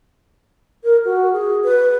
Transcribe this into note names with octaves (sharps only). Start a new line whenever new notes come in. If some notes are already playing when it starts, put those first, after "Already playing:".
A#4
F#4
G#4
B4